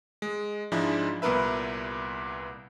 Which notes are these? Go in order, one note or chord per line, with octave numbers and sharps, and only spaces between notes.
G#3
G#2 F3 G#3 D4 E4
C2 A#2 B3 A#4 B4 E5